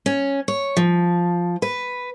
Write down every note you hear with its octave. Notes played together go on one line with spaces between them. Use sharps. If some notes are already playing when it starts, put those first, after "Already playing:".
C#4
C#5
F3
B4